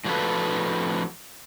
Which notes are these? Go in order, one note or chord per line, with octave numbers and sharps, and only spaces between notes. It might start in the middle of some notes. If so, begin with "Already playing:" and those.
A2 F3 D4 F#4 A4 B4